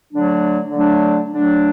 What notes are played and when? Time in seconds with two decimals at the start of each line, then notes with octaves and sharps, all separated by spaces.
0.11 D3 F#3 A3 D4
0.71 D3 F#3 A3 D4
1.32 D3 F#3 A3 D4